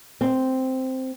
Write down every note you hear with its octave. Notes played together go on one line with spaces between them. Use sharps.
C4